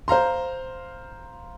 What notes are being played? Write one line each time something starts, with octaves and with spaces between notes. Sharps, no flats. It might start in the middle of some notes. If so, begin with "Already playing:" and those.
C5 F5 A#5 C6